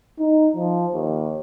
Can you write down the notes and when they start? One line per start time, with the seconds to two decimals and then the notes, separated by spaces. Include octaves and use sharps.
0.20 D#4
0.56 F3
0.94 D#2